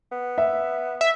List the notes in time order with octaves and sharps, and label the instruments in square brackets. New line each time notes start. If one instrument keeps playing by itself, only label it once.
[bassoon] B3
[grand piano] E5
[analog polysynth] E5